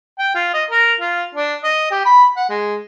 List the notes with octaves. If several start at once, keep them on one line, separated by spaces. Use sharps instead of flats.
G5
F4
D#5
A#4
F4
D4
D#5
G4
B5
F#5
G#3